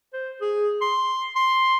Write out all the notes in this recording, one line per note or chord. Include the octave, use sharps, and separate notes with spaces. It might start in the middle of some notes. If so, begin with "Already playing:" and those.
C5
G#4
C6
C6